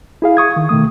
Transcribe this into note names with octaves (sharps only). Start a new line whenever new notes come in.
E4 G#4 F5
C#6 D#6 G#6
D#3
B2 D#3 A3 D#6